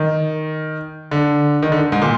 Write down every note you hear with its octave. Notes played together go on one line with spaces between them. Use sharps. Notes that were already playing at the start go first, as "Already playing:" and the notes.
Already playing: D#3
D3
D#3
D3
G#2
A#2